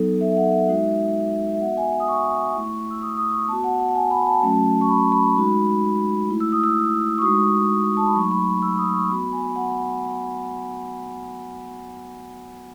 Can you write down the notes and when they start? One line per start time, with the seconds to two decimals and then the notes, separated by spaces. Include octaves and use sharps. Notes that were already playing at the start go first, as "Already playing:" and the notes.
Already playing: F#3 B3 D#4 A4
0.21 E5
0.32 E5
0.37 F#5
0.52 E5
0.68 G#3 D#4 F#4
1.54 E5
1.61 B3 F#4 F#5
1.77 G#5
2.00 D#6
2.08 C#6
2.55 A3 E4
2.91 E6
3.02 D#6
3.17 D#6
3.33 C#6
3.48 B3 F#4 A5
3.64 F#5
3.80 F#5
3.88 A5
3.95 G#5
4.11 B5
4.26 A5
4.42 F#3 A3 C#4 F#4
4.81 C#6
4.89 B5
5.12 B5
5.36 G#3 D#4 F#4
6.29 A3 E4
6.40 E6
6.52 D#6
6.64 E6
7.18 C#6
7.22 G#3 D#4 F#4 D#6
7.97 A5
8.06 B5
8.15 F#3 A3 D#4 C#6
8.31 B5
8.62 E6
8.78 D#6
8.94 C#6
9.09 B3 F#4 B5
9.32 G#5
9.56 F#5